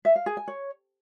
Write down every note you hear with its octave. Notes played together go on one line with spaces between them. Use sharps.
E5
F5
G#4
G#5
C#5